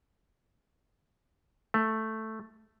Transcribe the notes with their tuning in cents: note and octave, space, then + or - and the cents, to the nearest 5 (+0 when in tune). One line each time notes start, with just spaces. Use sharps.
A3 +0